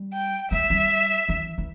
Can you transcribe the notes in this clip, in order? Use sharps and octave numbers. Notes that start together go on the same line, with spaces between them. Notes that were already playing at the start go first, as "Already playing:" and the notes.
Already playing: G3
G5
G#3 E5
G3
E3
E3